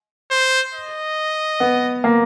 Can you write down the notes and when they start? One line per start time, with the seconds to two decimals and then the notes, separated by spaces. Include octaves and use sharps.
0.31 C5
0.74 D#5
1.60 B3
2.04 A#3